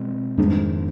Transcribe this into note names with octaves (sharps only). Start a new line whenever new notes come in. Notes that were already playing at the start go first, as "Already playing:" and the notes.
Already playing: B2 G#3 C4
F2 G#2 D#3 B3 D4